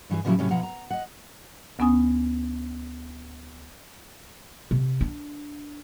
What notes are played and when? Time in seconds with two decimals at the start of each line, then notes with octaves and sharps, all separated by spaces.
0.10 G2 E3 G4 G#4
0.25 A2 C#3 F3 F#3 E4 G4
0.39 D2 A2 C3 F#3 A3 C#4
0.51 B2 F3 F#5 A#5
0.63 A#5
0.90 D#5 F#5
1.79 D2 B3 C#4 G#5 D#6
4.71 C3
5.01 D4